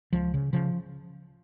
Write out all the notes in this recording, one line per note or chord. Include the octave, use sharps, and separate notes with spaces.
C#2 F3
C#3
C#3 F3